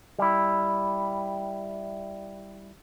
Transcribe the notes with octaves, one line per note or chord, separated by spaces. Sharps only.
G3 E4